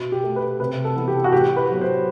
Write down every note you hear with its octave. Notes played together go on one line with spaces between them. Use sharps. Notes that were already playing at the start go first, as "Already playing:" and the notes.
Already playing: B2
G4
A3
B4
C3 B4
A4
E3 B3
G4
F#4
A2 G4
B4
F#3 B3
C5